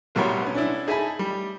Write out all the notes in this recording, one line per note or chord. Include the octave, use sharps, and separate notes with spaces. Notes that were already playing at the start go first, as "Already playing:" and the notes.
A1 B2 G3 A#4 C#5 C6
B3 C#4
C#4 D4 E4
D#4 G#4 E5 G#5 A5 B5
G3